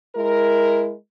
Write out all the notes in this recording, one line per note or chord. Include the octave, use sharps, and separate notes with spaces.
G#3 E4 A#4